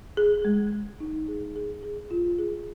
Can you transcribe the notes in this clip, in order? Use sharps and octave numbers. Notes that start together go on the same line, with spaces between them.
G#4
G#3
G#3
D#4
G#4
G#4
G#4
F4
G#4